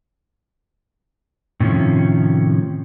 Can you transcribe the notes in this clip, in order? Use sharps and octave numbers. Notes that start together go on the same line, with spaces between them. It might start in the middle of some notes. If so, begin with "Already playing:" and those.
A2 C3 D#3 F3 C#4